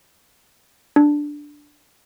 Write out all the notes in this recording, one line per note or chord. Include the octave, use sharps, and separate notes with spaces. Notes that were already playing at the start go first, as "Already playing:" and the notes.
D4